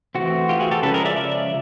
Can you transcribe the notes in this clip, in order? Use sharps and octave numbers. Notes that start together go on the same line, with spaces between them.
E3 A3 C4 F#4
F4 G4
F#4 G#4
G4 A4
C#3 F3 G#3 C#4 A4 B4
G#4 A#4
D5 E5
D5 E5